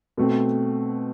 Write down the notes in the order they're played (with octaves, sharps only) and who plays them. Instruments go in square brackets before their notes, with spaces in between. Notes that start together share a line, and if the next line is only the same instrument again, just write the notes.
[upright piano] B2 A3 C4